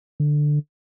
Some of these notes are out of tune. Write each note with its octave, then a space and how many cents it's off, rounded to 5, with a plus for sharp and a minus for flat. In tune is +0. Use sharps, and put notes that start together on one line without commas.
D3 +10